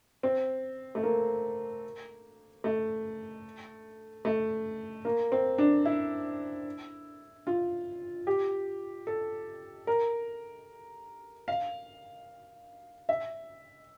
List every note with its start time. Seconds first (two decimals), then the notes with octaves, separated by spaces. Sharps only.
0.23 C4
0.95 A3
1.03 A#3
2.64 A3
4.25 A3
5.05 A#3
5.32 C4
5.58 D4
5.85 E4
7.47 F4
8.27 G4
9.07 A4
9.87 A#4
11.48 F5
13.09 E5